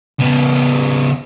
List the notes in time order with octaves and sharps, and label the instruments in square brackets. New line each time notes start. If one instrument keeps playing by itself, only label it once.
[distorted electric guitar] C#3 B3